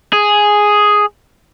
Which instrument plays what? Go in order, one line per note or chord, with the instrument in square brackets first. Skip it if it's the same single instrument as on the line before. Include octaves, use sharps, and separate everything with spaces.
[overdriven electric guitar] G#4